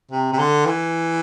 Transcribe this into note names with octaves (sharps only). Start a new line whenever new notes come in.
C3
C3
D3
E3